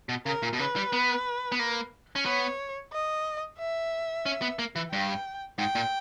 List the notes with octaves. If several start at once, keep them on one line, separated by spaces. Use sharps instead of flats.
B2
C#3 A#4
A#2
B2
C#3 B4
G3
B3
B3
A#3
C#4
B3 C#5
D#5
E5
C#4
B3
A#3
E3
G2 G5
G#2 G5
A#2